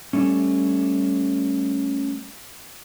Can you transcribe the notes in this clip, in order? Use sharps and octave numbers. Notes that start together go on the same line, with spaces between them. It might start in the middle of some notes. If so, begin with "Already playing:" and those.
G3 A3 C#4